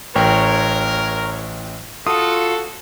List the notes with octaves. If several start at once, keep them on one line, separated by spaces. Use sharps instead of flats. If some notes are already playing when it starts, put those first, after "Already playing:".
A1 A#4 C#5 G5
F4 F#4 A4 D#6